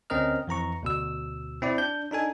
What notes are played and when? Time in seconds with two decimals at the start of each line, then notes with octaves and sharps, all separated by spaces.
0.10 D2 C4 C#4 A#4 D#5 F6
0.48 F2 E3 A#5 C#6
0.83 D2 B2 E6
1.62 C4 E4 D5
1.78 D4 G6
2.11 D4 D#4 A4 G#5